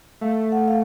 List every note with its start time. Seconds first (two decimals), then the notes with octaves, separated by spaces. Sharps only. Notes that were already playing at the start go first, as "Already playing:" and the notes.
0.21 A3 F5
0.52 F#5
0.68 F5